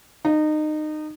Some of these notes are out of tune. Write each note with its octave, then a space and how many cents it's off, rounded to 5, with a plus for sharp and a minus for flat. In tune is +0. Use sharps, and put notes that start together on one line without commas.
D#4 -25